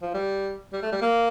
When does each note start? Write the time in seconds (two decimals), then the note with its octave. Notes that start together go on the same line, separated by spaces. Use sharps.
0.02 F3
0.14 G3
0.73 G3
0.82 A3
0.92 G3
1.02 A#3